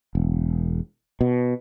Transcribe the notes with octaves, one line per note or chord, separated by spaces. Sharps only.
E1
B2